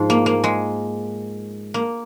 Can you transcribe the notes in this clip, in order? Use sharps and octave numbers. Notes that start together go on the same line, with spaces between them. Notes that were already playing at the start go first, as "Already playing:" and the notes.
Already playing: G#2 F3
A#3
A#3
G#3
A#3